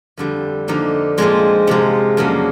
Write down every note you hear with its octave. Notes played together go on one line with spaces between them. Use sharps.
F2 D3 G3
D3 F3 A#3 D#4
A#2 F3 G#3 C4
C3 F3 G#3
F2 C#3 F#3 A#3 D4